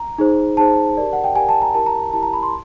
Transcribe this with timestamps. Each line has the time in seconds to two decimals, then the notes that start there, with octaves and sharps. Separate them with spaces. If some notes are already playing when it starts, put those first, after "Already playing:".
Already playing: A#5
0.18 D#4 G#4 C5
0.57 D#4 G#4 C5 A5
0.97 G4 A#4 D5
1.13 F#5
1.24 G5
1.35 G4 A#4 D5 G#5
1.49 A5
1.62 A#5
1.74 E4 G4 A#4 A5
1.86 A#5
2.13 E4 G4 A#4 A5
2.23 A#5
2.33 B5
2.43 C6